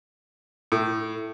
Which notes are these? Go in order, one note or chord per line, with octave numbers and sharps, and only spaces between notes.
A2